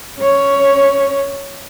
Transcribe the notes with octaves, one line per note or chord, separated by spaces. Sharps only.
C#4 C#5